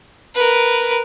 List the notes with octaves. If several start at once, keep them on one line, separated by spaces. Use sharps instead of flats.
A#4 B4